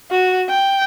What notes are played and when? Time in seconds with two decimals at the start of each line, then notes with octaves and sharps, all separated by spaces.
0.11 F#4
0.49 G5